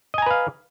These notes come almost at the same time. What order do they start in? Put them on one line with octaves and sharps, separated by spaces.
D#5 G#5 A#5 B4 F5